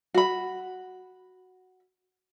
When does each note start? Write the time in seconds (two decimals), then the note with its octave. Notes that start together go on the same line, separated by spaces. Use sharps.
0.14 F#4 B5